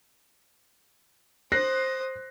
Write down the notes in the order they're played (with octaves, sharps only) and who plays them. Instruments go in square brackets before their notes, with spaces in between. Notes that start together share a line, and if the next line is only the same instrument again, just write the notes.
[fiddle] C5 D#6 [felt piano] F#6 A#6 C7